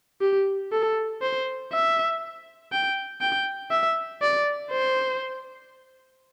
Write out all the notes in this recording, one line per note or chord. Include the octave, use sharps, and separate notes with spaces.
G4
A4
C5
E5
G5
G5
E5
D5
C5